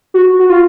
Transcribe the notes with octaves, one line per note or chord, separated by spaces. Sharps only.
F#4
F#4
F4